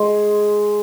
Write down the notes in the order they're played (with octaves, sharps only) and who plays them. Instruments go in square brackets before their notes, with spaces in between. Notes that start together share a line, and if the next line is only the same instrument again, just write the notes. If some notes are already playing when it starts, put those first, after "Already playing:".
Already playing: [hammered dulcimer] G#3